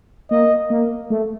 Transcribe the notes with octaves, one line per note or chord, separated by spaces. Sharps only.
A#3 D#5
A#3
A3